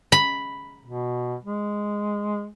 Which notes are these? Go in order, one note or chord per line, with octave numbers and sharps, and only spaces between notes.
B5
B2
G#3